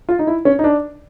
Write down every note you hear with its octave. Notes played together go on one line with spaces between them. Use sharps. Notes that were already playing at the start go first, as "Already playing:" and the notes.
F4
D#4
E4
C#4
D#4
D4